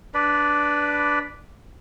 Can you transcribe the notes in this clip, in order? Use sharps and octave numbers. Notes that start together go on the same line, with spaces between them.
D4 B4 D5 B5